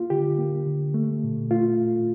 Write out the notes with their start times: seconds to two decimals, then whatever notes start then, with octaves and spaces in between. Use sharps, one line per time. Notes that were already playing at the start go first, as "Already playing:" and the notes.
Already playing: A#3 F4
0.10 D3 G4
0.38 A#3
0.66 D3
0.94 A3
1.23 A#2
1.51 A3 F4